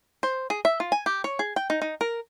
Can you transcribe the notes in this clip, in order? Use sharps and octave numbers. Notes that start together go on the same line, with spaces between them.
C5
G#4
E5
F4
G#5
G4
C#5
G#4
G5
D#4
D#4
A#4